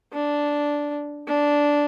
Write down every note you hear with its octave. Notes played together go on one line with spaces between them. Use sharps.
D4
D4